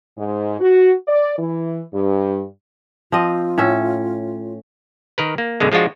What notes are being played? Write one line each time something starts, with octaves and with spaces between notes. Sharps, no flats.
G#2
F#4
D5
E3
G2
F3 C4 F4 D#5
A2 C#4 E5
D#3 A#4 B4
A#3
F#2 B2 D3 G#3
F3 G#3 D4 F4 F#4